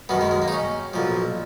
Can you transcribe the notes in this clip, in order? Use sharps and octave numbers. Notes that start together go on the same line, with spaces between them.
F#2 D#3 B3
G#3
G#3
A#3
D#4
C#4
B1 A#2 F3